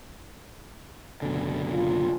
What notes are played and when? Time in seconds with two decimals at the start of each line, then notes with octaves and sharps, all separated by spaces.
1.22 F#1 B2 D3
1.72 F4